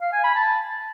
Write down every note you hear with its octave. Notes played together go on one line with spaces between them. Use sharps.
F5
G#5
B5
A5